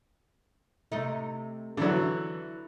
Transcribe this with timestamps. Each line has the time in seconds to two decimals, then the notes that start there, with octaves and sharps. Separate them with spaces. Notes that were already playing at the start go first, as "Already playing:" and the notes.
0.92 C3 A3 D#4
1.77 D3 E3 F#3